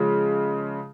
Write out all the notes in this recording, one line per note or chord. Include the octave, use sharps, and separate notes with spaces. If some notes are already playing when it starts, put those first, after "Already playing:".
Already playing: C#3 F3 G#3